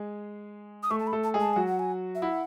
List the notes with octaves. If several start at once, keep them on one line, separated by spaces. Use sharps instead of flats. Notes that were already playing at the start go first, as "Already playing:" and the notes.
Already playing: G#3 G#4
D#6
A3 A4 C#6
A5
B5
A3 A4
A5
G#3 G#4
A5
F#3 F#4 G#5
F#5
G#5
E5
E4 F#5